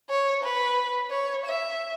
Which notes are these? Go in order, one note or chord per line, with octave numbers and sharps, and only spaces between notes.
C#5
B4
C#5
E5